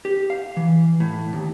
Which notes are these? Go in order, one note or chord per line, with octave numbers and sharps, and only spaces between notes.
G4
F5
E3
A2
D#2